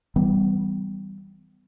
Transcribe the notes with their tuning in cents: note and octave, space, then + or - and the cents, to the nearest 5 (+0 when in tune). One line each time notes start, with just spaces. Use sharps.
E3 -20 G3 -10 B3 +25